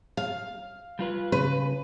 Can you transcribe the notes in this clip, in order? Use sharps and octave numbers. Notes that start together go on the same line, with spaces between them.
F5
G3 F4 B4
C#3 B4